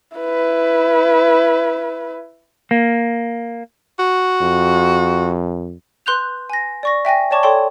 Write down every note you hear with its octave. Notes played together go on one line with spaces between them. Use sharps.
E4 B4
A#3
F#4
F2
B4 C6 F#6 G6 F7
G#5 A#6
D5 C#6 A#6
E5 G5 G#5 A#6
C#5 D5 A5 C#6 D6 G#6
A4 C#5 D5 G5 C6